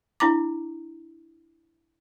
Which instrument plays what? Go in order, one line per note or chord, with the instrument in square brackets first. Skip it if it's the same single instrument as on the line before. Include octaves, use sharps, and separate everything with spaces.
[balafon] D4 E4 A#5 D6